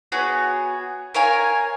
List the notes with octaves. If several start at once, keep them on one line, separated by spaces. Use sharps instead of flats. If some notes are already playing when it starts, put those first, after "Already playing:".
B3 F#4 G#4 C#5
A#4 C#5 F5 G#5